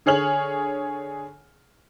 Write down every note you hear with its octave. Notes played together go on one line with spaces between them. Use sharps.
D3 G#4 C#5 F6 F#7